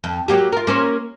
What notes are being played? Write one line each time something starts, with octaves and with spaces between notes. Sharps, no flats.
F2
F#3 A#3 G4
F4 A#4
A#3 C#4 C5